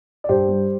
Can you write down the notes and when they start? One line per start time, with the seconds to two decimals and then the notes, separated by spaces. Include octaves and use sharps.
0.24 D5
0.29 G2 G4 C5
0.49 G3